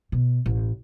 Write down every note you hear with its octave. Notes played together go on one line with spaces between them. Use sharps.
B2
A1